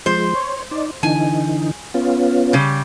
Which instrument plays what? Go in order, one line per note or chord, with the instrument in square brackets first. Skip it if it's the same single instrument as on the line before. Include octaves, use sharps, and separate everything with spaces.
[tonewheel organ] F3 G#3 [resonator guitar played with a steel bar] C5
[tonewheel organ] C#5
D#4 D5
[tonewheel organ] D3 E3 D#4 [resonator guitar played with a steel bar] G#5
[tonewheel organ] B3 C#4 F4
[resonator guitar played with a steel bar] C#3 G3